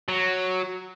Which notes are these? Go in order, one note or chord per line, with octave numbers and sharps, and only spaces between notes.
F#3